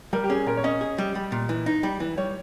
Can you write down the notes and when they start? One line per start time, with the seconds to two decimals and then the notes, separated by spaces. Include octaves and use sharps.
0.13 G3 A#4
0.24 G4
0.30 C#4 G#4
0.46 A#2 A#4
0.57 C#5
0.64 C#4 D#5
0.81 G#4
0.98 G3
1.15 G3
1.32 A#2
1.49 E3
1.66 D#4
1.83 G3
2.00 E3
2.17 G3 C#5